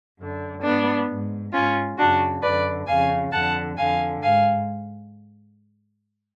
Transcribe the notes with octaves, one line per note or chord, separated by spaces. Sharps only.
F#2 D3
G#2 B3 D4
G#2
G#2 C#4 F4
F#2 C#3 D4 F#4
F#2 D3 B4 D5
F2 C#3 F5 G#5
F2 D3 F#5 A5
F2 D3 F5 G#5
G#2 F5 G#5